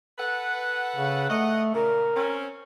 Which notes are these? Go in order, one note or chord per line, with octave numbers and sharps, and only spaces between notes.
A4 B4 F#5
C#3
A3 D#5 F#5
A#2 C#3 A#4
C4 C#4